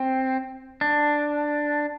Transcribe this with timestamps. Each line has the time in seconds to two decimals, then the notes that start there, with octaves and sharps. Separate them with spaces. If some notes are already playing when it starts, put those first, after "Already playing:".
Already playing: C4
0.81 D4